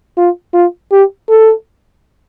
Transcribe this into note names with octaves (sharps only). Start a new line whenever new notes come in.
F4
F4
G4
A4